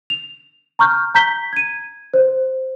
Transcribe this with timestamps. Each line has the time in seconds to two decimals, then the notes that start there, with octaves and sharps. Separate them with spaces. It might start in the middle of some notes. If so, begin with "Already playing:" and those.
0.10 F7
0.79 A#5 C#6 F6 G6
1.15 A#5 G6 B6 G7
1.53 G#6 D#7
2.14 C5